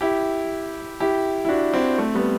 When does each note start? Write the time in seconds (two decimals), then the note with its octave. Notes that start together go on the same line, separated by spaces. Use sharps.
0.01 E4 G4
1.00 E4 G4
1.45 E4
1.49 D4 F#4
1.73 C4 E4
1.98 A3 C4
2.15 G3 B3